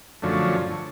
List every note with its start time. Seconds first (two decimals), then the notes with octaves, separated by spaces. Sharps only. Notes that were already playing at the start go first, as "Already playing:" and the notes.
0.22 F#2 D3 F3 A3 C#4